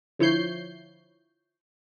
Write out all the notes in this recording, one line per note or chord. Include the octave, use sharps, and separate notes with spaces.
D3 F3 E4 C#5 G6 C7